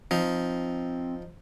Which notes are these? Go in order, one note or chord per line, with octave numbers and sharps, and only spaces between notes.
F3 C4 D#4